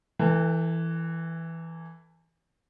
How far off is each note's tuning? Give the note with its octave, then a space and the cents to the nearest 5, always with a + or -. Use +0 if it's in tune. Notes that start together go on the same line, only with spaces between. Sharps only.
E3 +0 A4 +25 G5 +40